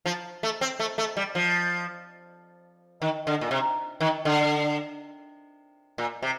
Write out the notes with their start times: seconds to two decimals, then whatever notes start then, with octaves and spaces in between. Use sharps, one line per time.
0.06 F3
0.43 A3
0.61 C4
0.80 A3
0.98 A3
1.17 G3
1.35 F3
3.02 D#3
3.27 D3
3.41 A#2
3.51 C3
4.01 D#3
4.25 D3
5.98 A#2
6.22 C3